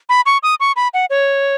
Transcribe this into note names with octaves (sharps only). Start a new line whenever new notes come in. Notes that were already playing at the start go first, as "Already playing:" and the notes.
B5
C#6
D#6
C#6
B5
F#5
C#5